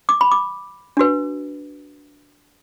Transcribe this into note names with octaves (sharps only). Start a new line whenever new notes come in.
D6
B5
D6
D4 F#4 B4